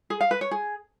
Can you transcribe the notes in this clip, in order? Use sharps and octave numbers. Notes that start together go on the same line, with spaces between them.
G#4
F5
B4
C#5
G#4